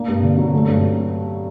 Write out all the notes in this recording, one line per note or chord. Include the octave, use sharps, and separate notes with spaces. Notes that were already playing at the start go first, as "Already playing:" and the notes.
Already playing: A#3 D4
G2
D3
F#3
A3
G2